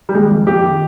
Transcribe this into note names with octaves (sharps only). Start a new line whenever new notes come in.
G3
D#3 G#3
F2
F2 G4
D#3